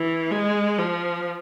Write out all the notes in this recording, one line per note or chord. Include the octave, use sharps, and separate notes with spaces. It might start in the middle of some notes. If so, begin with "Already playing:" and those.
Already playing: E3
G#3
F3